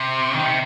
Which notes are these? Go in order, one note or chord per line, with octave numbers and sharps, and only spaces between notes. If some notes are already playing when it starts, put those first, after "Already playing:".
Already playing: C3
D#3
C3